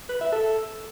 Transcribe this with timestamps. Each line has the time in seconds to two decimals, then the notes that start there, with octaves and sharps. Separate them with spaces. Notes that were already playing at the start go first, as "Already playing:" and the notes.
0.09 B4
0.21 E5
0.32 A4